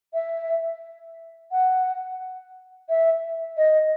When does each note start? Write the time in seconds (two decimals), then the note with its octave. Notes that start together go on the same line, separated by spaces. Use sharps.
0.14 E5
1.52 F#5
2.89 E5
3.57 D#5